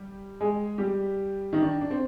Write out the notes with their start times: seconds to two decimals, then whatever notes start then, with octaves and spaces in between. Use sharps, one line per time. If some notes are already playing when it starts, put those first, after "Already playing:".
Already playing: G3 G4
0.40 G#3 G#4
0.78 G3 G4
1.53 D#3 D#4
1.62 D4
1.81 D4
1.90 C4